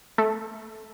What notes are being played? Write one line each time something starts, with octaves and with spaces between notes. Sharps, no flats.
A3